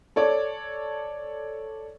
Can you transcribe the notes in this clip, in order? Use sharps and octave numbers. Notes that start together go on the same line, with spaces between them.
A4 C#5 D5 D6